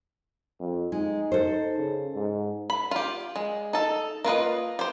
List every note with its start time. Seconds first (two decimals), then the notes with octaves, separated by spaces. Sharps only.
0.60 F2
0.92 G#3 D#4
1.32 A4 C5
1.78 C#3
2.15 G#2
2.70 B5
2.91 F4 G4
3.36 G#3
3.73 D#4 A4
4.24 A#3 F4 B4 D#5
4.79 G4 C5